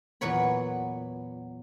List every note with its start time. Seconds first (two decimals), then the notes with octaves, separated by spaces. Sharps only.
0.21 E2 A#2 F#3 B4 C#5 B5